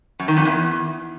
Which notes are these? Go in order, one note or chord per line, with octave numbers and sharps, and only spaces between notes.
F#2
D#3
F2
E2